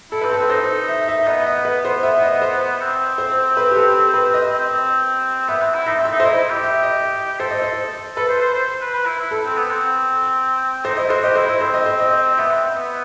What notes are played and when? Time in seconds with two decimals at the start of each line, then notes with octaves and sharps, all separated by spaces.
0.12 E4 A4
0.21 C4 B4
0.31 A4
0.37 C4
0.50 D#4 C5
0.88 E5
1.08 E5
1.26 B3 D#5
1.46 D#5
1.65 B4
1.85 C5
2.03 E5
2.23 D#5
2.42 C5
2.81 C4
3.18 C5
3.57 B4
3.71 G4
3.76 A4
4.14 B4
4.34 C4 D#5
4.46 C4
4.59 C4
5.48 B3 E5
5.62 C4
5.74 E4
5.86 D#4 E5
5.99 C4
6.05 E5
6.12 D#4
6.20 C5
6.25 E4 D#5
6.38 E4
6.50 G4
6.63 E5
6.83 D#5
7.39 A4 C5
7.51 D#5
7.62 C5
8.16 A4 B4
8.29 C5
8.42 C5
8.55 C5
8.81 B4
8.94 B4
9.06 E4
9.19 E4
9.31 A4
9.44 C4
9.57 B3
9.70 C4
10.85 D#4 C5
10.97 E4 D#5
11.10 F#4 C5
11.23 G4 D#5
11.35 E4 C5
11.48 E4 D#5
11.61 C4 C5
11.74 D#5
11.86 C5
12.00 D#5
12.38 B3 E5
12.51 C4
12.76 B3